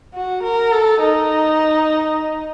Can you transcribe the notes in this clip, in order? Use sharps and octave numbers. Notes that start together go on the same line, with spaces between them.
F#4
A#4
A4
D#4